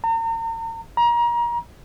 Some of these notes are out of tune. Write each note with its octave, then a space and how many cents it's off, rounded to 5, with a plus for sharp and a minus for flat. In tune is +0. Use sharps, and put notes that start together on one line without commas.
A#5 -40
A#5 +30